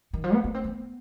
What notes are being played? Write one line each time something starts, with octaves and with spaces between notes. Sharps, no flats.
D#3
F3
B3
B3
C4
B3